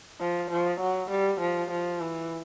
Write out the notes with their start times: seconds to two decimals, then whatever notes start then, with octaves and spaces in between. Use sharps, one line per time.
0.20 F3
0.50 F3
0.81 F#3
1.10 G3
1.40 F3
1.71 F3
2.00 E3